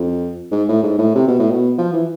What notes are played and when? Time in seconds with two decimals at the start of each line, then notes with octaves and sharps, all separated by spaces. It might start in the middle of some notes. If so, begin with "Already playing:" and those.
Already playing: F2
0.52 G#2
0.69 A2
0.83 G#2
0.99 A2
1.15 C3
1.28 B2
1.39 A2
1.52 B2
1.79 F3
1.93 E3